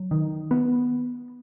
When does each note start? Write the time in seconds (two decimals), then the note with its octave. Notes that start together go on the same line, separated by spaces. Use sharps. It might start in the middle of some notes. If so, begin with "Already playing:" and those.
Already playing: F#3
0.11 D#3
0.51 B3